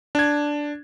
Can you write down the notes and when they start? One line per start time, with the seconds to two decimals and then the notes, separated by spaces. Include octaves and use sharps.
0.15 D4 G#6